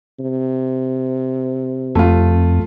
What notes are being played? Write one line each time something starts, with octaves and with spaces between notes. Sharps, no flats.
C3
F2 A3 F4